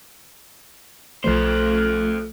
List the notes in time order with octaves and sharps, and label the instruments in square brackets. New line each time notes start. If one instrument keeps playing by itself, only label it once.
[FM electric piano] B1 F3 A3 [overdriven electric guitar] A4 C5